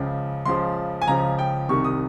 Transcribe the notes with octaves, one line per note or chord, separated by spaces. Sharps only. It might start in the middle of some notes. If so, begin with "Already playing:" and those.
Already playing: C#2 C#3 F3
C#2 C#3 F3 C6
G#5
C#2 C#3 F3 A#5
G5
C2 C3 D#3 C#6
D#6